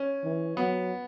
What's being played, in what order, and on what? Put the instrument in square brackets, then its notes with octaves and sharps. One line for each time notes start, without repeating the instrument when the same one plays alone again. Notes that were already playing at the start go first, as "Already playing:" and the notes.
Already playing: [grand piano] C#4
[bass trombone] E3
[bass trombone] F#3 [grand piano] B3